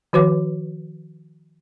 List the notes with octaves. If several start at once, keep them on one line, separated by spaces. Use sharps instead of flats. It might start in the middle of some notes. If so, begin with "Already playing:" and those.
D#3 F3 F#4 B4 C#5 D6